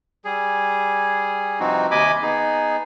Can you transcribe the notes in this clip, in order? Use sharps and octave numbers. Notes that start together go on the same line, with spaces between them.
G3 G#4
G2 C3 F3 C4 D#4 F#4
D#2 C3 D#5 G#5 B5 D6
B3 D#4 G#4